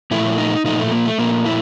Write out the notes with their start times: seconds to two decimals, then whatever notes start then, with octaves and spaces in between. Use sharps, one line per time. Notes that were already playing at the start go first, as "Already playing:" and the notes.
0.11 A#2 F3 A3 E4
0.38 D#4
0.64 A#2 F3 A3 D#4
0.79 A3
0.92 A#3
1.06 A3
1.18 A#2 F3 A3 A#3
1.46 E4